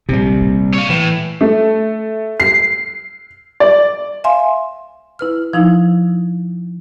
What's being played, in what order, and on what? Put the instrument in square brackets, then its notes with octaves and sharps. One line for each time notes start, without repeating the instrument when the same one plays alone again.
[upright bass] A#1 [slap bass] C3 G3
[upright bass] A#2
[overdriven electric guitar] C#5 F5
[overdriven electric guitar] A2 [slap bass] E3
[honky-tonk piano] A3
C7
D5
[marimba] E5 F5 G#5 C6
E4 B4 F6
F3 D#4 E4